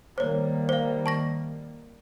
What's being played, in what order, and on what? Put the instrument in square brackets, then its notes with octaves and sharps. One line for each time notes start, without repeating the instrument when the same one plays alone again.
[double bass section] D#3 G3 A#3 [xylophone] C5 C#5
[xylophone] C5 F5
A5 C#6 A#6